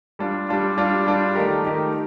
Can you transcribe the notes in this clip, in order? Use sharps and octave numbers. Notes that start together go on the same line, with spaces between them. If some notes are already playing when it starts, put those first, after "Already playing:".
G3 D4 F4
G3 D4 F4
G3 D4 F4
G3 D4 F4
D#3 A3 D#4 G4 A#4
D#3 A3 D#4 G4 A#4